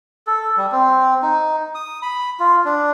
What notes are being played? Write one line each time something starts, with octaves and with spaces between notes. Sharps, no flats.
A4
G3
C4
D#4
D#6
B5
F4
D4